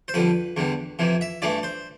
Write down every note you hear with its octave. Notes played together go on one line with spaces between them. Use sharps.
C5
F2 D3 G3 B4
E2 D3 G3
F2 C3 E3
E5
G2 E3 A3 D5
C5